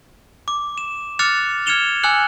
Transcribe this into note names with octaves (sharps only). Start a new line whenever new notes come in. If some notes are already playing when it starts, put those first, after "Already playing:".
D6
E7
D6 F6 F#6 A6 C#7 F7
F6 G#6 C#7 E7 F7 G7
G#5 D6 E6 F#6 C#7 F#7